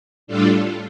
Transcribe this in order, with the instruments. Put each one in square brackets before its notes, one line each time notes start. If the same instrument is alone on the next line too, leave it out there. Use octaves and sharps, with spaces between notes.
[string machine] A2 G3 D4 F4 A4